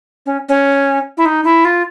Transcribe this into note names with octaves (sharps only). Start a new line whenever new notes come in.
C#4
C#4
E4
D#4
E4
F4